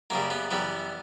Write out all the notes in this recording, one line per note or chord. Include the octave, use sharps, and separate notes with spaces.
F#2 C#3 G3 A#3
B3
F#2 E3 G3 B3